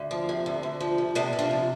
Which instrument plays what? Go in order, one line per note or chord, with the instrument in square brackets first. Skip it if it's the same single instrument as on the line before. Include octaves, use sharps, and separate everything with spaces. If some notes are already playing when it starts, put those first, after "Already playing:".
Already playing: [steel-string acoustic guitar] D2
F3
C3
D2
D2
F3
C3
C3 B3 D4
C3
D4 F4
F3